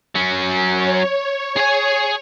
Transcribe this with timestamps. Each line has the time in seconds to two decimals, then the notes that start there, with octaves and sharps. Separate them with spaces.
0.16 F#3 C#4
0.74 C#5
1.57 G#4 G#5